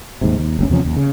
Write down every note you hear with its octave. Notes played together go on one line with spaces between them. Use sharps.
D#2 G#2 C3
D#2
F#1 D2 C#4
E2 C3 F3 C#4
D#2
C#3